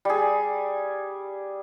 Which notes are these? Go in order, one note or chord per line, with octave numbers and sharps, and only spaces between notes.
G3 G#4